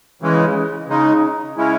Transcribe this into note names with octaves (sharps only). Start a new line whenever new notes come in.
C#3 E3 G#3
C#3 G#3 D#4
C#3 G#3 C#4 E4